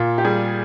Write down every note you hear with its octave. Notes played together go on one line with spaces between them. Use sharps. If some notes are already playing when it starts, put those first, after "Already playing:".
Already playing: A#2 F4
G4
G3 G#4